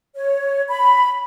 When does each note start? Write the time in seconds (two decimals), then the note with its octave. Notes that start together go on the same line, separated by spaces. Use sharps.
0.15 C#5
0.69 B5